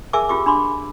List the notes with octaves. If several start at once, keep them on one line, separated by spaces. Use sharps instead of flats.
G#4 A#4 E5 G#5 D6
C#4 F4 G4 D6
D4 B5 C6 D6